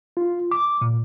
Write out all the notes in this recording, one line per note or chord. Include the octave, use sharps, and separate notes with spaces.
F4
D6
A#2